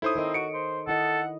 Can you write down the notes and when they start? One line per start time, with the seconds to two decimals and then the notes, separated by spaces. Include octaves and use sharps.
0.02 D#4 E4 A4 C5 C#5 D#6
0.15 D#3 C4 A#4 D#5
0.34 F#4 C#7 D7
0.54 C5
0.87 D#3 E4 A4 D#5 F#5